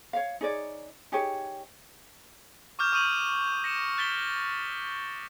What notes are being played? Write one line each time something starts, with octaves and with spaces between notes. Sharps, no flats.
C#5 F5
D#4 G#4 C#5 D5
D#4 G4 G#4 C#5
C#6 D6 F6 G6 E7
C#6 D#6 G6 D#7 F7 F#7
A#6 C#7 D#7 E7
F#6 A6 B6 D7 G7